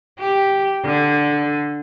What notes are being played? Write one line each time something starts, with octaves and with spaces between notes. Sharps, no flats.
G4
D3